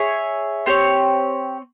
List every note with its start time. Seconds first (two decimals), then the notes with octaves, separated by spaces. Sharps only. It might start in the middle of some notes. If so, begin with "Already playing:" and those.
Already playing: G#4 C#5 E5
0.66 C4 G4 A#4 C#5